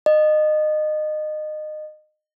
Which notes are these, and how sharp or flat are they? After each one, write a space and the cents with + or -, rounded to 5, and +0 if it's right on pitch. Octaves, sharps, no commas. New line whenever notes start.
D#5 -25